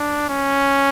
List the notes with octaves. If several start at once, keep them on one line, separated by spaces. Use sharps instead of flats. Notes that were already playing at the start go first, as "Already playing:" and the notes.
Already playing: D4
C#4